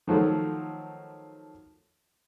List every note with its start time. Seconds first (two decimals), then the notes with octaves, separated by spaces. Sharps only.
0.07 D#3 F3 F#3 A3